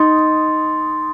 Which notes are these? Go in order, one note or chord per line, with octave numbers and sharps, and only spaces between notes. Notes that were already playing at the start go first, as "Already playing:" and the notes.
Already playing: D#4 C6 D#6 A6